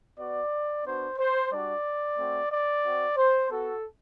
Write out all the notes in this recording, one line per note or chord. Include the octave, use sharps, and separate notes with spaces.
B3 F#4 D5
B3 D4 F#4 C5
C5
G3 D4 F#4 D5
A3 C4 F#4
D5
C4 F#4
C5
B3 F#4 A4